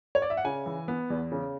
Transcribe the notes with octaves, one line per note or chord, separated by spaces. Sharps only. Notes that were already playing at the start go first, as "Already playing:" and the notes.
C#5
D5
E5
F#5
C#3 G#5
E3
B3
E2
C#3